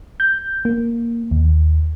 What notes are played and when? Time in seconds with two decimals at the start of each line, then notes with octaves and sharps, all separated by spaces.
0.20 G6
0.65 A#3
1.31 D#2